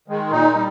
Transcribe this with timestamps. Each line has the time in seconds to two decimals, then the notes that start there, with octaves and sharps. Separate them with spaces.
0.08 D#3 G#3
0.31 A#2 D#4
0.55 G3